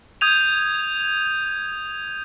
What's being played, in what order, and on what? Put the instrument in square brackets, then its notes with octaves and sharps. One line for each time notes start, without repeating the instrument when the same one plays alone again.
[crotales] D#6 G6 G#6 D#7 F7